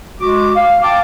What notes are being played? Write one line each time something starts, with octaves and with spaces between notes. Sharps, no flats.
G#3 F#4 D6
F5
F5 G5 A5 D6